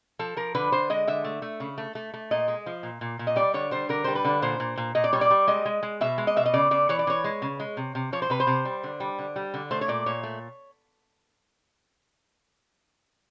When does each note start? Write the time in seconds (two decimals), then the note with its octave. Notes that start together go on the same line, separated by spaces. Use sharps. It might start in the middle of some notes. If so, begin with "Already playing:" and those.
0.19 F3 A4
0.37 F3 A#4
0.55 D3 B4
0.72 D3 C5
0.90 G#3 D#5
1.07 D3 E5
1.24 A3
1.42 A3
1.60 C#3
1.78 A3
1.95 A3
2.14 A3
2.31 A#2 D#5
2.48 G#3
2.66 F3
2.83 A#2
3.01 A#2
3.19 A#2
3.27 D#5
3.36 G3 D5
3.54 D3 C#5
3.71 G3 C5
3.89 D3 A#4
4.04 G3 C5
4.15 B4
4.25 D3
4.42 A#2 C5
4.60 A#2
4.77 A#2
4.95 A#2 D#5
5.04 D5
5.13 G3 C#5
5.21 D5
5.30 G3
5.47 G#3 D#5
5.65 G#3
5.83 G#3
6.01 B2 E5
6.18 G#3
6.27 D#5
6.36 B2 E5
6.46 D#5
6.54 C#3 D5
6.71 C#3 D5
6.89 E3 C#5
6.99 D5
7.07 E3 C#5
7.24 G#3
7.42 C#3
7.60 G#3
7.77 C3
7.95 C3
8.12 F3 C#5
8.22 C5
8.30 C3 B4
8.40 C5
8.47 C3
8.65 G3
8.83 D3
9.00 G3
9.19 D3
9.36 G3
9.54 D3
9.71 A3 C5
9.81 C#5
9.88 A#2 D5
10.06 A#2 C#5
10.23 A3